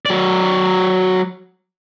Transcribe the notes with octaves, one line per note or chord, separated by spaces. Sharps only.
F#3 D5